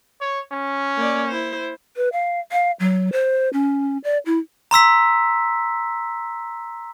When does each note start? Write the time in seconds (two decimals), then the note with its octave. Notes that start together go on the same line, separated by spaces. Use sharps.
0.21 C#5
0.52 C#4
0.96 A#3 D5
1.28 E4 C5
1.97 B4
2.13 F5
2.52 F5
2.80 F#3
3.12 C5
3.53 C#4
4.04 D5
4.26 E4
4.71 A#5 C6 E6 B6